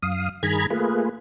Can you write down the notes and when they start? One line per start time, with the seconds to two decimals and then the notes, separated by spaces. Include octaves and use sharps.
0.02 F#2 F5 D#6
0.43 G2 D#3 G#4 A#5 B5 G#6
0.70 A3 A#3 F4 G#4 B4